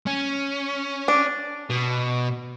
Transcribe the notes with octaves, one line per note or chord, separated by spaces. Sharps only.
C#4
D4
B2